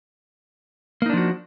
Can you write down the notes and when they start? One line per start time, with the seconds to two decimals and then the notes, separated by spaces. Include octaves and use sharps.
1.02 A#3
1.06 D#4
1.10 D4
1.14 F3
1.17 F#4